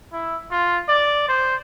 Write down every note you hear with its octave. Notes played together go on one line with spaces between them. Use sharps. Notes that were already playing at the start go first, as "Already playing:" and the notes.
E4
F4
D5
C5